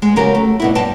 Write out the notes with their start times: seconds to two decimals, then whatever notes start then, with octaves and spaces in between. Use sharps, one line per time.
0.02 G#3
0.16 C#3 F#3 G4 A#4
0.35 A3
0.60 G2 B2 E4
0.75 G2 G5 A5